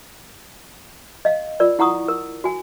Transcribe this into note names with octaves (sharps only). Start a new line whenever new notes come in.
D#5 F5
F4 A#4 D5
E4 F#5 A#5 C#6 D#6
A#4
F#4 G#5